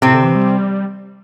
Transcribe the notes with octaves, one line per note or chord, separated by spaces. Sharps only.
A2 C3 C4
D3
E3
G3